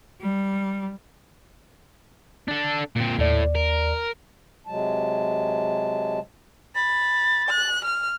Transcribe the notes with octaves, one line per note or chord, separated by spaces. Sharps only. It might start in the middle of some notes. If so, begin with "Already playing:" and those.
G3
D4 A4
A#2 C4
D#2 A2 D5
A#4
C3 F#3 G#3 A5
B5 A6
F#6
F6